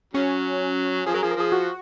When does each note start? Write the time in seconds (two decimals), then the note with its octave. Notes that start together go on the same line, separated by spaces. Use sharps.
0.13 C#3 F#3 C#4
1.06 F3 G#4
1.14 F#3 A#4
1.22 F3 G#4
1.31 A#4
1.37 F3 G#4
1.52 F#4